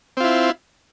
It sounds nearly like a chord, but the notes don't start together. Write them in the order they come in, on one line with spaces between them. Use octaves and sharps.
C4 F4 E4